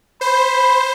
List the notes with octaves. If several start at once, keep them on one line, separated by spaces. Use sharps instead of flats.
C5 B5